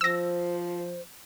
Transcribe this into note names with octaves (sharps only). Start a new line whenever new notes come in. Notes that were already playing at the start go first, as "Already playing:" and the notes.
F3 C5 E6 A#6